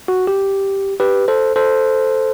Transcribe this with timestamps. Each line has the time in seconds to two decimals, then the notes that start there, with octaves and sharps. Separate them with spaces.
0.08 F#4
0.27 G4
1.00 G4 B4
1.28 A4 C5
1.56 A4 C5